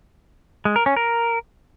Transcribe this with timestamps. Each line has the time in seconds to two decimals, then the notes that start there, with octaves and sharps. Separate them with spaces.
0.65 G#3
0.76 A#4
0.86 C#4
0.97 A#4